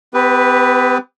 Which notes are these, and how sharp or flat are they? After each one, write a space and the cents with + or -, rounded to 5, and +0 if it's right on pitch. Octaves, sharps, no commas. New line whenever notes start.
B3 +45 G4 +15 B4 +0